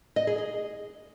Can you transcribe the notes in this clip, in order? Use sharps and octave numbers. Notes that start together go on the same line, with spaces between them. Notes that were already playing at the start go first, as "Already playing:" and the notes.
D#5
G#4
G#4